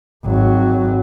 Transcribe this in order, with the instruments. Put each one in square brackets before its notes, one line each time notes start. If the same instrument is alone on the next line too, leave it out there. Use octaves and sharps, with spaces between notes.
[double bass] G#1 F#3